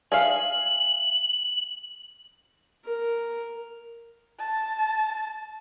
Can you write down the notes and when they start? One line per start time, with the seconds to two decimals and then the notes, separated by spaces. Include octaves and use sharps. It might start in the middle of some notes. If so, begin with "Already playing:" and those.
0.12 G#4 E5 F5 F#7
2.85 A#4
4.39 A5